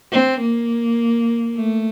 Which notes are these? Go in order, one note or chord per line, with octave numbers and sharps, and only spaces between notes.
C4
A#3
A3